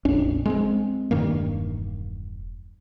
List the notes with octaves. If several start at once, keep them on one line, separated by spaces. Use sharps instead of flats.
A#1 F2 C#4 D4
G#3 A3 C4
E1 G2 D#3 A#3